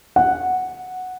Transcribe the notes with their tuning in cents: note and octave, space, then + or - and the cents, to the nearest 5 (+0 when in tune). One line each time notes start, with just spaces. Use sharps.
F#5 -5